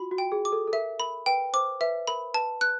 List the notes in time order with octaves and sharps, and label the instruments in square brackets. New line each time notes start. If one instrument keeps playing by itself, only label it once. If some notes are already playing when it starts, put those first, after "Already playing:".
Already playing: [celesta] F4 F#4 [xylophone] B5
[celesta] F#4
[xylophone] G5
[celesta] G#4
[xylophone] D6
[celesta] A4
A4
[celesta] A#4 [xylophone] E5
[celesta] A#4 [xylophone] B5
[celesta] B4 [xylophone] G5
[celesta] C5 [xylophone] D6
[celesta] B4 [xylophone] E5
[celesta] A#4 [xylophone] B5
[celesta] B4 [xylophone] A5
[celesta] B4 [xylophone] F#6